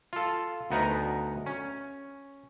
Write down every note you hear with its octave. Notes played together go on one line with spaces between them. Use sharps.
F4 A4
D2 B3 D#4 A#4 F#5
C#4